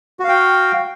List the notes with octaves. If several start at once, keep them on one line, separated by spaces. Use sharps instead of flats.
F#4 F5 G5